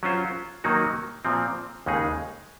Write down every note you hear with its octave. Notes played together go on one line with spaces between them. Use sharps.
F#3 C#4 F4 C5
D#3 F#3 A#3 D#4 F#4
A#2 F3 C4
D#2 C#3 G#3 D#4 G#4